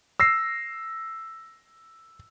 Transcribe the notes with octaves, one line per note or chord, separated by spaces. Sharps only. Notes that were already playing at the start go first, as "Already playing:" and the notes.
E6 A#6 C7